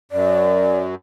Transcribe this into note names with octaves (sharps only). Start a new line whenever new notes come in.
F#2 D5